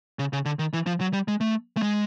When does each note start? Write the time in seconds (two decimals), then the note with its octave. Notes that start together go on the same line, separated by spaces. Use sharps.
0.19 C#3
0.33 C#3
0.45 D3
0.59 D#3
0.73 E3
0.87 F3
1.00 F#3
1.13 G3
1.28 G#3
1.41 A3
1.77 A3
1.82 G#3